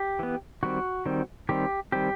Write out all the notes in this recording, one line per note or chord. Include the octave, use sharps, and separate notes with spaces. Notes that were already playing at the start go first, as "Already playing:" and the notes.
Already playing: G4
E3 B3
D#3 G3 C4 F#4
D#3 G3 C4
D#3 G3 C4 G4
D#3 G3 C4 G4